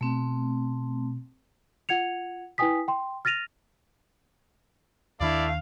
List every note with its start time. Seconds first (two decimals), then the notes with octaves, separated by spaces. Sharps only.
0.01 B2 A3 C4
1.89 F4 F#5 G#6 C#7 F7
2.58 E4 B4 G5 G#5 D#6 B6
2.88 G5 C6
3.25 F6 A6 A#6 D#7 F7
5.21 D#2 D#3 A3 D4 E4 D5 F5